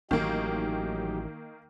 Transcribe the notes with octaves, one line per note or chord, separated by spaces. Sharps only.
A1 D#3 F#3 A#3 D#4 G4